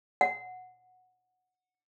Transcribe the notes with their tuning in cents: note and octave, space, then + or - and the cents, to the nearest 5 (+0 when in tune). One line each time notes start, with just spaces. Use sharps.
F#5 -10